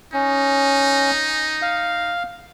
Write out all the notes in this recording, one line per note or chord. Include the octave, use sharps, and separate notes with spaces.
C#4 D#4
F5